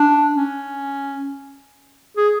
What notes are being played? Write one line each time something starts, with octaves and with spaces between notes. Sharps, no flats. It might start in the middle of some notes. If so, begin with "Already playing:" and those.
Already playing: D4
C#4
G#4